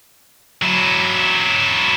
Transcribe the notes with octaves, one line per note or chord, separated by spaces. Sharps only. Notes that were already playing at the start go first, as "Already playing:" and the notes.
F#3 E4